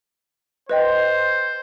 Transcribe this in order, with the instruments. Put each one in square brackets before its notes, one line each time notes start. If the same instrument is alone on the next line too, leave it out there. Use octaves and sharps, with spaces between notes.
[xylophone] B4 D#5 G5 [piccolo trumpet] C5